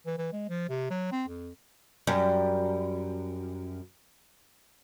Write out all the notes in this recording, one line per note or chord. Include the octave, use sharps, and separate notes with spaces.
E3
E3
G#3
F3
C3
F#3
C4
F2
F#2 G3